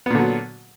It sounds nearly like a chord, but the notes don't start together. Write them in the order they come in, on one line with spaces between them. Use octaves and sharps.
B3 A#2 D3 F#3